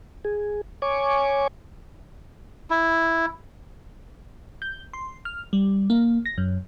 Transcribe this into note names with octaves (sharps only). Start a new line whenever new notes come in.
G#4
C#5 G#5 C#6 D6
E4
G6
C6
F6
G3
A#3
A#6
F#2